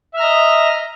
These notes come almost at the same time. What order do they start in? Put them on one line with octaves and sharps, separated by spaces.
E5 F6 A#5 D#5